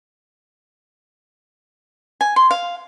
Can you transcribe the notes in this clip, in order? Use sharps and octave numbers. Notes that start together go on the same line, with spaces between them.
G#5
C6
F5